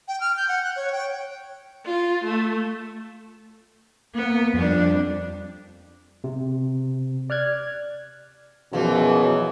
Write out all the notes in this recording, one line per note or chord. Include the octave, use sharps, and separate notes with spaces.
G5
F6
G6
F#5
F#6
C#5
G5
F4
A3
A#3 B3
F2 G3 D4
C3
D5 F6 F#6 G#6
F#2 B2 E3 F3 G#4